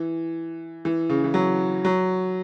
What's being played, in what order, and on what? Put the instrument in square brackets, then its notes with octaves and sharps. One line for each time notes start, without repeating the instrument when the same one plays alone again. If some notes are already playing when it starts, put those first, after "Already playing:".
Already playing: [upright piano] E3
E3
C#3
E3
F#3
F#3